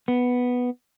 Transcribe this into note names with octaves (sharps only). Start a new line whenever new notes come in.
B3